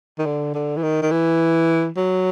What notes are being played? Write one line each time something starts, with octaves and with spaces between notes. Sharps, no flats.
D#3
D3
D3
E3
D#3
D#3
E3
F#3